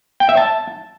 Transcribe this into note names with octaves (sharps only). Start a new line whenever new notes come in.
G5
E5
A5